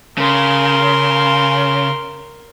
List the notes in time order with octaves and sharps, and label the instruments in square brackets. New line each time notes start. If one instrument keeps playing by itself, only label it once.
[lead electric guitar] C#3 [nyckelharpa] A#4 C6